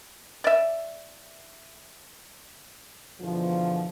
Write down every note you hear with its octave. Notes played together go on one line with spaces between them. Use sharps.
D5 E5
E2 B2 D3 F3